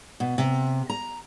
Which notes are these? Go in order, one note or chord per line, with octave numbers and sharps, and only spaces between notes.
B2
C3
A#5